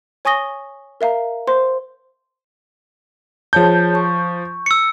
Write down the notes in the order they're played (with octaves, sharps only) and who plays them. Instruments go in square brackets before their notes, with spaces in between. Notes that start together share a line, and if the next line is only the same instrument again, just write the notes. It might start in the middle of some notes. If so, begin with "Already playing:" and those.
[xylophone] C#5 G#5 C#6 D#6 A#6 G7
A#4 E5 F5 A#5
C5 C6
[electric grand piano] F3 G6 [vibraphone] G#4 C#5 A5
[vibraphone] C#6
[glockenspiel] E6 C#7